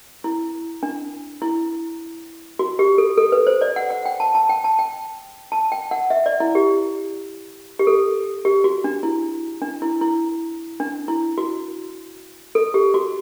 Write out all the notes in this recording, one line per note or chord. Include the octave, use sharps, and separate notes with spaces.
E4
D4
E4
F#4
G4
A4
A4
B4
C5
D5
F#5
F#5
G5
A5
A5
G5
A5
G5
A5
G5
F#5
E5
D5
E4
G4
G4
A4
G4
F#4
D4
E4
D4
E4
E4
D4
E4
F#4
A4
G4
F#4